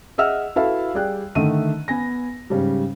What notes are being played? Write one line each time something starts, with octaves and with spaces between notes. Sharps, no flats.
G#4 D#5 E5 F#5 E6 F6
E4 F#4 A4 B4 E5 F5
G3 G#4 D5 G5 F#6
D3 D#3 A3 D#5 E5 D#7
B3 G#5 A#6
G#2 C#3 G3